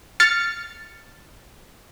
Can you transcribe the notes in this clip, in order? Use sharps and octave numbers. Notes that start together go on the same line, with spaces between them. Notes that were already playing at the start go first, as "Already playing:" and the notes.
F6 A6 C#7